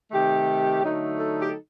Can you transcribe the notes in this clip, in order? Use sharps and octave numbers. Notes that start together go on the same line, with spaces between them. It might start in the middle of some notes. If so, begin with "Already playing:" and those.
C3 D#3 A3 G4
D3 F#3 A3 D#4
A4
G4
A4